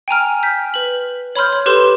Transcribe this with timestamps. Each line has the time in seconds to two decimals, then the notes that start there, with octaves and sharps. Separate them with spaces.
0.08 G5 G#5 A#5 F6
0.43 F6 G6 B6
0.74 B4 F6 F#7
1.36 C#5 B5 C6 F6 G6
1.53 C#5
1.66 G4 A4 B4 C6 G6 E7